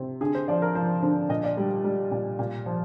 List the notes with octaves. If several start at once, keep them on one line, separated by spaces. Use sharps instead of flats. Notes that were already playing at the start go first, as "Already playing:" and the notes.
Already playing: C3
D3 G#4
C5
F3 D5
A#4
F3 C5
D3 C5
A#2 D#5
D5
G3 G4
G3
A#2
A#2
F3